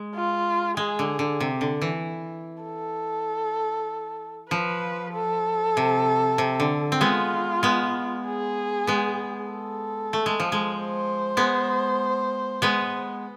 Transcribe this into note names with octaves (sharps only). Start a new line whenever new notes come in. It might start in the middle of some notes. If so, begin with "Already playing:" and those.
Already playing: G#3
F4
G#3 G#4
D3
D3
C3
D3
E3
A4
F3 B4
A4
C3
C3
D3
C4
G#3 B3 F4
G#3 B3
G#4
G#3 B3
A4
A3
G#3
F3
G#3
C5
G#3 B3
G#3 B3